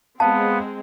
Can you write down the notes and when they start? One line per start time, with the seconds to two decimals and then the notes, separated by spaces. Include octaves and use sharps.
0.20 G#3 B3 C4 F5 A5